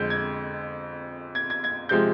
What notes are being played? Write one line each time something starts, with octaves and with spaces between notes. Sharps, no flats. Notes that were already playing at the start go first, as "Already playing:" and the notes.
Already playing: F2 D3 G#3 G6
G#6
G#6
G#6
G#6
C3 F3 G#3 G6